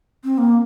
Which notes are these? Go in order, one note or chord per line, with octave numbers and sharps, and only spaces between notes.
C4
A#3